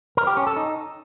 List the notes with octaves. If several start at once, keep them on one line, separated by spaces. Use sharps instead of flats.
A#4
G4
C#4
A4
D#4